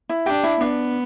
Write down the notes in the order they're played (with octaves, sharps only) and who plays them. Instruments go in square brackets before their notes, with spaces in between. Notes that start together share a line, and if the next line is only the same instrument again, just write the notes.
[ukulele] E4
[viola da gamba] D4 [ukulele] G4
[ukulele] E4
[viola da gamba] B3 [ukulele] D4